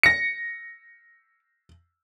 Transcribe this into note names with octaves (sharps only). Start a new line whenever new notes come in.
A#6 C#7